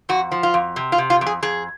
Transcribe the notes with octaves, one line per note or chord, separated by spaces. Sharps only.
F2 F#4
F3
F4
F2
C3
F4
C3
F4
F2
G#4
F2 G#4